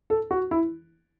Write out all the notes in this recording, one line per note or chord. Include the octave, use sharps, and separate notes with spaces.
A4
F#4
E4